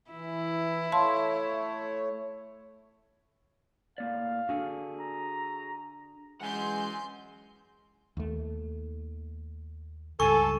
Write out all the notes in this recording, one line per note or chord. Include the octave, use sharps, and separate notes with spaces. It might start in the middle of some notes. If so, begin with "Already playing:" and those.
E3 E4
A3 C#5 F5 A5 C6
A2 A#3 D5 F5
D4 F#4 G#4 A4
A#5
E3 G#3 C#4 F#5 G#5 C6 G6
D#2 A3
C#2 G2 A4 G#5 C#6